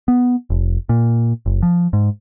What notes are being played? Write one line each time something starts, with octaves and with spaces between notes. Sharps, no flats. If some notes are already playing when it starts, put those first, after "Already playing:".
B3
F1
A#2
F#1
F3
G#2